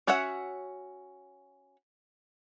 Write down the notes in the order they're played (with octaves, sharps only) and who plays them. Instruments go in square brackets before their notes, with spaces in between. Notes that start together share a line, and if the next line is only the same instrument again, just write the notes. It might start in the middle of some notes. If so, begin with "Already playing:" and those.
[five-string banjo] C#4 F#4 C#5 E5 F#5